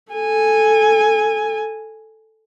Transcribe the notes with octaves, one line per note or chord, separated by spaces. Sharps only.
A4 G#5